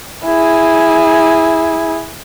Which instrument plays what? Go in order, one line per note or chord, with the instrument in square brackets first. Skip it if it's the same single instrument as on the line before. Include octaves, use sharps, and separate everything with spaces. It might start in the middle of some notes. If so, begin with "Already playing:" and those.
[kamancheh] E4 G#4